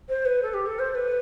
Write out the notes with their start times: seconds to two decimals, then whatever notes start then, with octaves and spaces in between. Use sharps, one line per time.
0.08 C5
0.25 B4
0.42 A4
0.53 G4
0.66 A4
0.78 C5
0.90 C5
0.94 B4